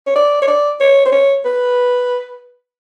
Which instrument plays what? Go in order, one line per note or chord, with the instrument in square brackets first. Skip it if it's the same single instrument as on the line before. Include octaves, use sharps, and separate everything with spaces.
[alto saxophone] C#5
D5
C#5
D5
C#5
C5
C#5
B4